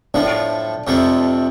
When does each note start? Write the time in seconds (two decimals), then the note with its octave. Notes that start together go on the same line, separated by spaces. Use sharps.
0.14 A2 F3 A3 D4
0.87 F2 C3 F3 A3